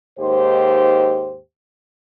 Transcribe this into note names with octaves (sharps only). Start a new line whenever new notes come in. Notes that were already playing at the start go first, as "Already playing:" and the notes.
D#2 G#2 G4 C5